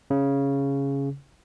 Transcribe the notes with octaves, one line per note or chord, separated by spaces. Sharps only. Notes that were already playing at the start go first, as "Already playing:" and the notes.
C#3